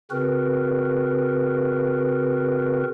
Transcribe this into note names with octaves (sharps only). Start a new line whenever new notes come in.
C#3 C4 F#4 A#4 B4